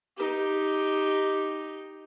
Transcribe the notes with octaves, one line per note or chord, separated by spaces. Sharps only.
D#4 G4